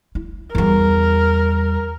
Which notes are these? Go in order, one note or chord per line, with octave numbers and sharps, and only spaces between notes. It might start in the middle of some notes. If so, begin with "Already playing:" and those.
E4
E2 G3 A#4